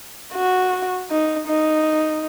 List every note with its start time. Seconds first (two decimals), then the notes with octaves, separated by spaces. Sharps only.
0.34 F#4
1.10 D#4
1.48 D#4